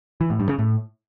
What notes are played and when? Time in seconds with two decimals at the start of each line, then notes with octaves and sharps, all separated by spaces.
0.21 E3
0.30 A2
0.40 G2
0.49 C#3
0.59 A2